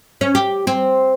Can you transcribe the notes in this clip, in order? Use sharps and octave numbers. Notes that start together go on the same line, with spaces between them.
C#4
G4
C4